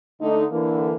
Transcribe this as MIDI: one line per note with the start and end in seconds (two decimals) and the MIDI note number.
0.22 0.45 50
0.22 0.45 57
0.22 0.45 63
0.51 0.95 50
0.51 0.95 52
0.51 0.95 58